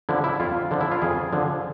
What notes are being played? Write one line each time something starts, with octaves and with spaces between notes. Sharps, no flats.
D3 F3 E4
E4
F2 F4
D3 F3
E4
F4
F2 G#4
D3 F3